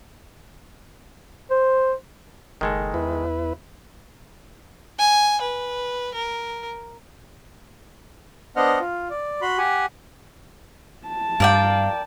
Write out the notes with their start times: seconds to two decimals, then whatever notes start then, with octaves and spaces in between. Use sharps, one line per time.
1.51 C5
2.61 F#1 D#3 G#3 A4
2.94 E2 E4 B4
4.99 G#5
5.41 B4
6.14 A#4
8.56 B3 D4 C5 D#5 F#5 F6
8.80 F4
9.10 D5
9.42 F#4 B5 C6
9.58 G4 F#5 G#5
11.08 A5
11.40 G2 A#4 D5 F5 G5